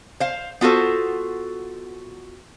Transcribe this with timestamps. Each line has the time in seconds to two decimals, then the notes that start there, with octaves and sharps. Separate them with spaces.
0.20 C5 F5
0.61 B3 F4 F#4 A4 C5